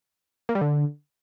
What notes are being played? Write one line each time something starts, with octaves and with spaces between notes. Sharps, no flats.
A#3
G3
D3